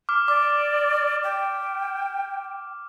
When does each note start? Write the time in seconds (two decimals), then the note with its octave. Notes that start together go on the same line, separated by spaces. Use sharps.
0.09 D6 F6
0.28 D5 D6
1.24 G5